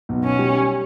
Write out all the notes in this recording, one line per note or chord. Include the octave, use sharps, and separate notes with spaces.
B1
C#4
G3